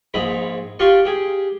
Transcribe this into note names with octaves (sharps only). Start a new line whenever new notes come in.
A#1 G#2 D#5 B5
F4 G4 D5 F5 C#6
G4 G#4